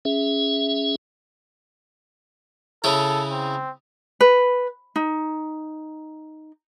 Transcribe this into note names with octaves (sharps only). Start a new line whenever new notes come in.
C#4 G#4 E5
C#3 C#4 E4 A4
C4
B4
D#4